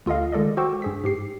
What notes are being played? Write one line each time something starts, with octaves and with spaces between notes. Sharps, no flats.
D2 F4 A4 D#5 F5
D#3 G#3 A4 D5 D#5
F#4 C5 G5 C#6 D6 E6
G2 G#4 B6
G#2 G4 C7